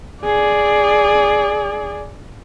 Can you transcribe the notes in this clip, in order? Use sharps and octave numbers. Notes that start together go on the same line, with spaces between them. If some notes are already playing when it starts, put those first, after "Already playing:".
G#4 D5